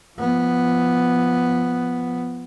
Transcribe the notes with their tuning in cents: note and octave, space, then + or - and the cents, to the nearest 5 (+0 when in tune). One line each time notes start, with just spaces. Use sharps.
F3 +0 B3 +0